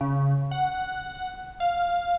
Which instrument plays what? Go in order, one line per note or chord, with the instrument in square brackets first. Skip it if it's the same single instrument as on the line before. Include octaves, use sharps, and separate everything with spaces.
[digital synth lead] C#3
F#5
F5